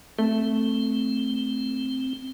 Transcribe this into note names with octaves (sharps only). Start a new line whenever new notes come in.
A3 C4